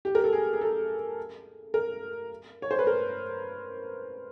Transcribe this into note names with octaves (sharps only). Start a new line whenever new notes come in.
G4
A#4
A4
G#4
G#4
A4
A#4
C#5
C5
B4
A#4